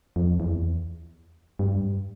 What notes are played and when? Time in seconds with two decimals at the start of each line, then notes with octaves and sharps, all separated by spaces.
0.16 F2
0.40 E2
1.59 G2